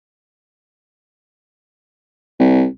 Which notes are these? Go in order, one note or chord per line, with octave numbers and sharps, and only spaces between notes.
C2